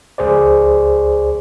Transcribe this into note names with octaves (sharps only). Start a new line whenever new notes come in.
C#2 G#4 C5 D5